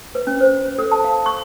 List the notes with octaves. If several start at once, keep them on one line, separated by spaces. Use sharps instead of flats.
B4
C#4
C5
A4
A5
F5
C#6